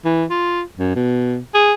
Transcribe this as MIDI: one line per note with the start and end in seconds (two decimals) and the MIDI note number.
0.05 0.24 52
0.30 0.62 65
0.79 0.91 42
0.96 1.38 47
1.54 1.73 68